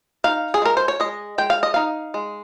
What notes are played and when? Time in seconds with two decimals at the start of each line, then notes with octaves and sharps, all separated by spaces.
0.24 D#4 F5
0.54 G#4
0.62 G#3 A#4
0.77 C5
0.88 C#5
1.00 G#3 D#5
1.38 G#3 G5
1.50 F5
1.63 D#5
1.74 D#4 F5
2.14 G#3